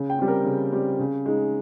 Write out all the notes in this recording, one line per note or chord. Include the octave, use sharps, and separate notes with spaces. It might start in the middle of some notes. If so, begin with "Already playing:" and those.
Already playing: C#3
G5
G3 C4
A#4
C#3
G3 C4
C#3
G#3 D#4